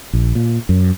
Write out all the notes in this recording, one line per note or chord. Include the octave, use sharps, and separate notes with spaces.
A#1
A#2
F#2